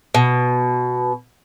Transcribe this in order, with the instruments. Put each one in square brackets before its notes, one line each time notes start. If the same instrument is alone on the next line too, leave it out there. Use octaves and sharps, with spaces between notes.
[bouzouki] B2